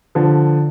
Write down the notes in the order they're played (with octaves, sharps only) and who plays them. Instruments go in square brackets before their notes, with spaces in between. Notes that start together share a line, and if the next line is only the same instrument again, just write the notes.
[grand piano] D3 F3